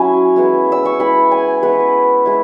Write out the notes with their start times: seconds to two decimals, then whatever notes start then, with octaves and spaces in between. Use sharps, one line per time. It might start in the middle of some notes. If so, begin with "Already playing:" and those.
Already playing: F#3 C#4 E4 G#5
0.36 G#3 B3 E4
0.72 E6
0.85 C#6
1.00 G#3 B3 E4 B5
1.31 G#5
1.63 G#3 B3 E4 B4
2.26 G#3 E4